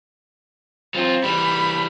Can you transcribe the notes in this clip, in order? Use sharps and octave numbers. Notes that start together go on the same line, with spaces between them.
F#3 C4 F4
E3 G3 B5